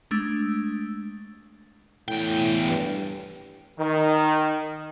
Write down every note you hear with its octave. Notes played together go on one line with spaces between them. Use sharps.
G#3 A3 D4 E6
E2 A2 G5
G2
D#3